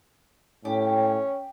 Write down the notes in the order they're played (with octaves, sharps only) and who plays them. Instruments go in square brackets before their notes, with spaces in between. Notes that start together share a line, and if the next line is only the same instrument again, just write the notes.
[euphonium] A2 [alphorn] C#4 [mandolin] G4